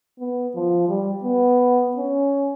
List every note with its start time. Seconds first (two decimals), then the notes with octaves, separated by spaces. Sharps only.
0.20 B3
0.55 F3
0.89 G3
1.24 B3
1.96 C#4